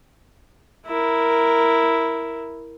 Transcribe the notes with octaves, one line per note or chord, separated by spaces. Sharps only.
E4 A#4